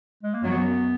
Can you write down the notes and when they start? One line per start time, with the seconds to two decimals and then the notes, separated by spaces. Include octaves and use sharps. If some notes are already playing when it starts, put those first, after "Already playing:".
0.23 G#3
0.34 A#3
0.43 F#2 F#3 B3